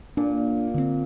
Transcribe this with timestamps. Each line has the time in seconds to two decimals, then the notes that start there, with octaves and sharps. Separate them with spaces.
0.17 A#2 D4
0.74 D3 C4